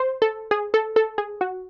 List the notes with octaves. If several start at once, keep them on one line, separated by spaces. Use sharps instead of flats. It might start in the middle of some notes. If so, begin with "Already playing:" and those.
Already playing: C5
A4
G#4
A4
A4
G#4
F#4